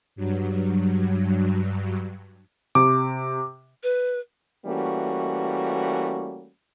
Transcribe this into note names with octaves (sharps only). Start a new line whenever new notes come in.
G2 F#3
C3 D6
B4
E3 G3 A3 A#3 C#4 F#4